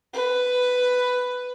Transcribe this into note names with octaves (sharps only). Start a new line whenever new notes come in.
B4